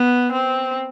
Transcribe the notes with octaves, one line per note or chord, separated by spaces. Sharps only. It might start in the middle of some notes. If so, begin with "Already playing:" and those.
Already playing: B3
C4